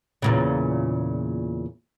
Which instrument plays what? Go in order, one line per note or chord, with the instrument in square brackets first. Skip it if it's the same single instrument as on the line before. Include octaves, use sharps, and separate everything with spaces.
[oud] E2 A#2 C#3